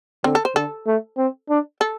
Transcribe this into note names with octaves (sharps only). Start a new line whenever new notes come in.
D3 C4
A4
C5
D3 A4
A3
C4
D4
A4